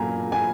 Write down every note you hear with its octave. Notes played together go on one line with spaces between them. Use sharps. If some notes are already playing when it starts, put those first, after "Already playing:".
Already playing: A#2 F#3 G#5 A#5
G#5